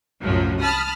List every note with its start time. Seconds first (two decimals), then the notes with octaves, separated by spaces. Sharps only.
0.22 C2 F#2 A2 F3 F#3
0.61 A5 B5 D#6 F6